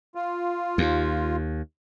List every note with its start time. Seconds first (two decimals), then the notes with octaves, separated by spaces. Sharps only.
0.15 F4
0.78 D#2